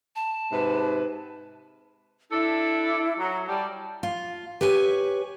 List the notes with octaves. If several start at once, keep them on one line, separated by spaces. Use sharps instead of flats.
A5
G#2 C3 B4
D4 E4 A4
F#3 A#5
G3 A5
F4
G4 B4 C#5 G#5